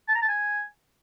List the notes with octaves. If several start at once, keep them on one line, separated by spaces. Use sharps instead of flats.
A5
A#5
A5
G#5